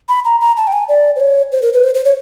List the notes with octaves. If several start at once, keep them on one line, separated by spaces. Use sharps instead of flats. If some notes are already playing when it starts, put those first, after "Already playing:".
B5
A#5
A#5
A5
G5
G#5
D5
C5
C#5
C5
A#4
B4
C5
C5
C#5